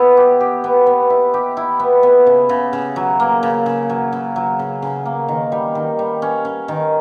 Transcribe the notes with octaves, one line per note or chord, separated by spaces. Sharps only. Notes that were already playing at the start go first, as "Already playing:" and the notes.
Already playing: B3 E4
G4
G4
B3
B3
E4
G4
E4
B3
B3
C#3
C#3
C#3
F#3
A#3
C#3
C#3
F#3
C#3
F#3
C#3
C#3
A#3
D#3
G3
D#3
G3
C#4
C#4
D#3